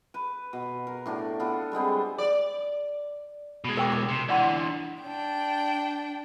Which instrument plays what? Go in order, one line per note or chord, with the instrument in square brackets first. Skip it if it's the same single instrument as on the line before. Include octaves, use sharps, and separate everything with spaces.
[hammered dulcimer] B4
B2
A#4
A2 D4 F#4
B3 F4 A4 F#5
G3 G#3 B3 C4
[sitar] D5
[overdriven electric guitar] B2 G#3
[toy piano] A#4 G5 D6
D6
[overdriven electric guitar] C3
[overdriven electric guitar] D3 E3 [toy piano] D5 F#5 C6
[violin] D4 G5